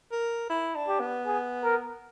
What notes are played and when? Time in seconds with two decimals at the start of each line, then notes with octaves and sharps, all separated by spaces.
0.12 A#4
0.50 E4
0.76 D4
0.88 G4
1.00 B3
1.27 G#4
1.64 A#4